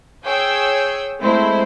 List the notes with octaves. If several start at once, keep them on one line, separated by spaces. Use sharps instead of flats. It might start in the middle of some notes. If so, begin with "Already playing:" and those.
G#4 C#5 G5 G#5 E6 G6
G#3 A3 C4 E4 C5